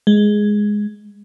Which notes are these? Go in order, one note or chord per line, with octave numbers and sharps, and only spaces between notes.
G#3